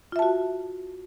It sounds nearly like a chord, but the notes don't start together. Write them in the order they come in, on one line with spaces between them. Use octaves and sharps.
F4 E5 A5 F#4